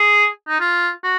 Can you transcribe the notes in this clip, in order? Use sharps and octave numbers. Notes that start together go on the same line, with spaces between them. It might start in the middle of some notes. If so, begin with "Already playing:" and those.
Already playing: G#4
D#4
F4
F#4